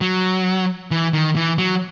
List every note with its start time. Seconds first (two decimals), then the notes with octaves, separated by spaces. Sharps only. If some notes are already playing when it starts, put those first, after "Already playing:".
0.01 F#3
0.91 E3
1.13 D#3
1.36 E3
1.58 F#3